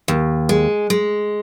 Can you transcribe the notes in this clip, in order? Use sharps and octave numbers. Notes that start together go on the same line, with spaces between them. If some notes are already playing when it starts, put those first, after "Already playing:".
D#2
G#3
G#3